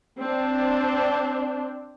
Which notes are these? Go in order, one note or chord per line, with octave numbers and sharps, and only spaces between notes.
C4 D4